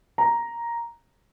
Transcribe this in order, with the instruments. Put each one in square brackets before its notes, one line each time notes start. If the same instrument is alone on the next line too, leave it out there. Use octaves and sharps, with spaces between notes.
[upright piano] A#5